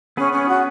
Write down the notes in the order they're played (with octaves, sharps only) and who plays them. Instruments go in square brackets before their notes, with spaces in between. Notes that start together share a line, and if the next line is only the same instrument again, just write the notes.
[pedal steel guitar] B3 G#4 B4 [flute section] C#4
[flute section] C#4
F#4